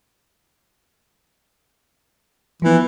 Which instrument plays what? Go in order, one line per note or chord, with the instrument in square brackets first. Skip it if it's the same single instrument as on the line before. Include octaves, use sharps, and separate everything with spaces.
[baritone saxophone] E3 [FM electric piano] F3 B3